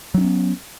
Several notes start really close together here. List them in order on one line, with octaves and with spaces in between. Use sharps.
F#3 D4 C#4 B3